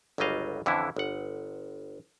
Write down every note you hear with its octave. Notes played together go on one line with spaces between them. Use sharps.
G1 C#2 F#3 G3 D#5 F5
F2 D3 E3 C#4 E4
G1 F#5